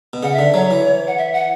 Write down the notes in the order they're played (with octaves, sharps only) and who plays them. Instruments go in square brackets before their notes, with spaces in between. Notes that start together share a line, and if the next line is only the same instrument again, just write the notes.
[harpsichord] B2
[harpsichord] C#3 [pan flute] F#5
[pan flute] E5
[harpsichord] D3
[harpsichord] F#3 [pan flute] C#5
[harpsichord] E3
[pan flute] F#5
E5
F#5